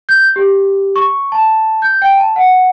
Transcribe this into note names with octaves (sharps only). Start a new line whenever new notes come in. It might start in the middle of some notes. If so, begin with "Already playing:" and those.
G6
G4
C#6
A5
G6
G5
A5
F#5